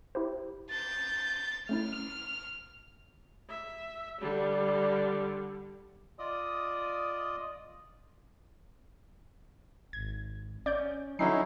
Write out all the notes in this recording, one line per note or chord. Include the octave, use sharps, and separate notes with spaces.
E4 G4 C5
G6 A6
A3 C#4 E4 F6
E5
D3 G3
F4 D5 D#5 D#6
G#1 G#6
C#4 D5 G6
D3 F#3 C#4 D#4 E4 C7